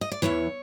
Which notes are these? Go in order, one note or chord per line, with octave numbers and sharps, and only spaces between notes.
D#5
D5
E2 C#3 E3 C#5